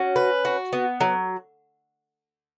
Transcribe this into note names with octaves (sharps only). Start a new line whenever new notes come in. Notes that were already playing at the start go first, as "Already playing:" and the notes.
Already playing: C#4 F#4
B4
F#4
B3
F#3